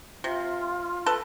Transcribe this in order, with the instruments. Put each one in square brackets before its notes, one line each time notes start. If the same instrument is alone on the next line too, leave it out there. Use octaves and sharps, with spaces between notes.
[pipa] C3 [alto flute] F4
[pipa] A4 B4